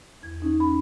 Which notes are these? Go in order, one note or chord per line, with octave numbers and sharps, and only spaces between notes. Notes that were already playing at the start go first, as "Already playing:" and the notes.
E2 G#6
C#4 D#4
B5